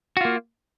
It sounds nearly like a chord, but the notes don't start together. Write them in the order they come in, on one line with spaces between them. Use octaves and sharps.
F#4 F4 A#3